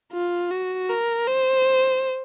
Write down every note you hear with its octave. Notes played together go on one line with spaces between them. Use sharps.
F4
F#4
A#4
C5